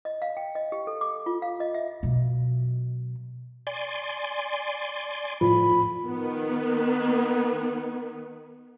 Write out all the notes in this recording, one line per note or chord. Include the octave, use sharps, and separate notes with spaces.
D#5
F5
G5
D#5
G4
A4
D6
F4
F5
D#5
E5
B2 F#3
D5 G#5 C6
A2 F3 B5
D#3 B3